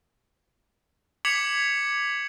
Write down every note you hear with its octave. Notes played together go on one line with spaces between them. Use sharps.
D6 G#6 B6 C#7 F7 F#7